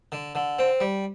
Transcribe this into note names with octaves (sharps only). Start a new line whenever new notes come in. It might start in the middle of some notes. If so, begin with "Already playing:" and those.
D3
D3
C4
G3